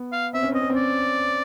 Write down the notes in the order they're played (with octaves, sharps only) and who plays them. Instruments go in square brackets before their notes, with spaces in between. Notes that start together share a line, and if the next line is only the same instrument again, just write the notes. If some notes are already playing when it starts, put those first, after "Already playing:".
Already playing: [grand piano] B3
[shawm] F5
[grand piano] C4 [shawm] E5
[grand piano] C#4
[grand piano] C4 [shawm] D#5
[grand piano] C#4
C4
[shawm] D5